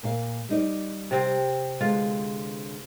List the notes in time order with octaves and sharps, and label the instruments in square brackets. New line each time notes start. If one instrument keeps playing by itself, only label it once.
[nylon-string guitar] A#2 F5
G3 D#4 D5
[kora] C3 C4
[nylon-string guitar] D3 G#3 B3 [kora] F4